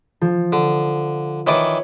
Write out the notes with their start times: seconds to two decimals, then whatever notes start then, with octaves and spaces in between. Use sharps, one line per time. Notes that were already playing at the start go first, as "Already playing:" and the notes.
0.21 F3
0.53 D3
1.47 D#3 E3 C#5 D5